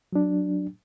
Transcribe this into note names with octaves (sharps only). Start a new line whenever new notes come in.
F#3 D4